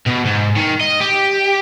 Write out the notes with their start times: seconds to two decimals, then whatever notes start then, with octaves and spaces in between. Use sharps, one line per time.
0.06 B2
0.25 G#2
0.56 D#3
0.81 D#5
1.01 G4